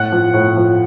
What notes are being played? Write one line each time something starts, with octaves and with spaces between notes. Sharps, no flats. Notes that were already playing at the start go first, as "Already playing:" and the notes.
Already playing: A2 F#5 F#6
F3
A2
F3